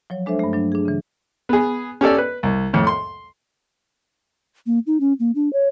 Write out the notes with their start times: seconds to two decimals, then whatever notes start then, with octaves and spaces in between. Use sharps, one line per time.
0.10 F3 F#3 C#5
0.26 G#3 D4 A4 C5 E5
0.39 G2 A3
0.53 F#3 D4
0.72 D4 G#4
0.85 C#3 E3
1.49 B3 G#4
2.01 C#4 G4 A4 D5
2.18 B4
2.43 C2
2.73 F2 A2
2.87 C6
4.66 A#3
4.87 D#4
5.00 C#4
5.20 A#3
5.35 D4
5.53 C#5